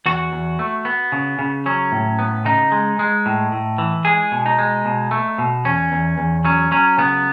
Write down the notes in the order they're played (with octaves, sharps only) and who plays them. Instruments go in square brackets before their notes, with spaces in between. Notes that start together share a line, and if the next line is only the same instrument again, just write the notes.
[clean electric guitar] E2 F#4
E2
A3
B3
C#3
C#3
F#3 C#4
A2
B3
C#3 D#4
G#3
G#3
A2
A2
E3
G#3 G#4
B2
D#4
G#3
B2
A3
B2
E2 C#4
E2
E2
F#3 C#4
F#3 C#4
C#3 B3